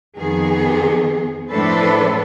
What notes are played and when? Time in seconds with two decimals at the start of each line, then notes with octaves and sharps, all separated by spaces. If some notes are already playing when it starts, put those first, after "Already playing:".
0.17 F2 D#3 B3 G#4
1.52 A2 F3 D4 A4 B4 C5